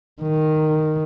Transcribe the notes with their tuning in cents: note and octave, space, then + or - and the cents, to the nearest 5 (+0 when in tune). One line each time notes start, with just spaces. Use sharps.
D#3 -5